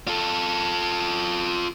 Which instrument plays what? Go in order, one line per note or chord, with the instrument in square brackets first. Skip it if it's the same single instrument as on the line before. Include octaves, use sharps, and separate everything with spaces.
[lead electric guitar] F4 A4